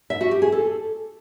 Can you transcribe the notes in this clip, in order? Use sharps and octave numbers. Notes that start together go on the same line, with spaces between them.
E5
F#4
G4
G#4
A4